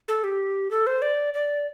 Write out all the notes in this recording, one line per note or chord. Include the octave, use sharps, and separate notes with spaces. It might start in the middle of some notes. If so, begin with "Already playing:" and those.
A4
G4
A4
C5
D5
D5